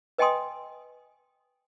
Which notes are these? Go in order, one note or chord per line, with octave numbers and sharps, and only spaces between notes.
B4 D#5 G5 G#5 C6 D#6